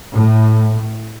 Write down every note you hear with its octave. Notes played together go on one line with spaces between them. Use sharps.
A2